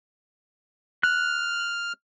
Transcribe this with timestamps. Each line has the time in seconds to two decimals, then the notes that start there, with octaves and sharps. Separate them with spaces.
1.03 F6 F#6